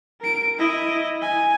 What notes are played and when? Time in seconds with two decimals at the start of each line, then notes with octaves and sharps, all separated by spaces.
0.21 A#4 D7
0.59 E4 D#5
1.21 G#5